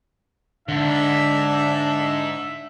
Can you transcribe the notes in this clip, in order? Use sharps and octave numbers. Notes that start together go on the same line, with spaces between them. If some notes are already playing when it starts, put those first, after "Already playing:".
G#2 D3 D4 E5